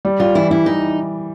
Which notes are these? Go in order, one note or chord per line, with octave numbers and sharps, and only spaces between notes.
G3
G3 F4
E3 E4
G3 E4
E3 D#4